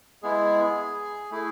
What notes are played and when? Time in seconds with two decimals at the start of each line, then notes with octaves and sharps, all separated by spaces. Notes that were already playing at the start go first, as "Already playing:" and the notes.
0.22 G#3 B3 E4 G#4
1.31 A3 E4 G#4